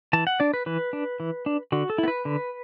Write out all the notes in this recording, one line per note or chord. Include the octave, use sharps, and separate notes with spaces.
E3 A5
F#5
D4 D5
B4
E3 B4
D4
E3
D4
D3 F#4
A4
B3 E4
B4
D3